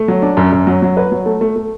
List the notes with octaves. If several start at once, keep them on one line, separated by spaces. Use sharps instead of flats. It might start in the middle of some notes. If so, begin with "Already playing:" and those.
Already playing: A3
F#3
D4
F#2
F#2
F#3
F#3
B4
F#3
A3
A3
A3